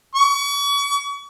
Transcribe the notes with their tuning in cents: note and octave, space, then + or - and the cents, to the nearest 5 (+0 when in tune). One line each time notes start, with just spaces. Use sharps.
C#6 +40